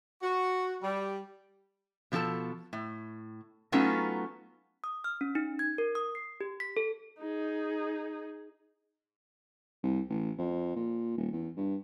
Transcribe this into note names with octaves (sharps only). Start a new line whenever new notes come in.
F#4
G3
B2 F3 C#4 A4 A5
A2
F#3 A3 B3 C#4 D#4 F4
D#6
F6
C#4
D#4
G#6
A#4
D#6
C7
G4
B6
A4
D#4 G#4
C2
A1
F2
A#2
D#1
E2
G2